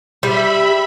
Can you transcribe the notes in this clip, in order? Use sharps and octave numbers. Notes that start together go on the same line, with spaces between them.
G3 E5 B5